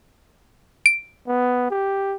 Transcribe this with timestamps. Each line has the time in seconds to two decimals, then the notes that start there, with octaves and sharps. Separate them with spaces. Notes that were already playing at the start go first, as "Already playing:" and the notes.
0.86 D7
1.27 B3
1.70 G4